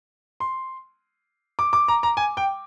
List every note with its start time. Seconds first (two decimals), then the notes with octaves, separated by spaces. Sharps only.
0.40 C6
1.59 D6
1.73 D6
1.88 A#5
2.03 A#5
2.17 G#5
2.37 G5